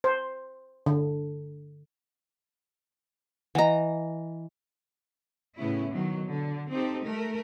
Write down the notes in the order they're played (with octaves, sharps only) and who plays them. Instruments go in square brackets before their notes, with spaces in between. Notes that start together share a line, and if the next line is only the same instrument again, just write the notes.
[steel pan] C5
D3
[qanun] E3 A#5 [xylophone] D#5 F#5
[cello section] A2 C#3 B3 C#4 E4
B2 D#3 F#3
D3
C4 D#4 G4 A4
A3 A#4